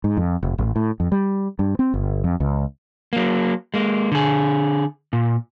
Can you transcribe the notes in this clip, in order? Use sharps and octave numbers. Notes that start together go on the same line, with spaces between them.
G#2
F2
F1
A1
A2
F2
G3
G2
C4
G1
F2
C#2
F#3 A#3
G#3 A#3
D3 G#4
A#2